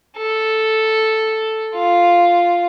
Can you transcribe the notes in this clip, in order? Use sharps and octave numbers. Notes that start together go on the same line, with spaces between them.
A4
F4